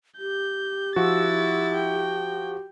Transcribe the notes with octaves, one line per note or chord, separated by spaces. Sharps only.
G4 G6
F3 E4 F#4 E6 A6
G5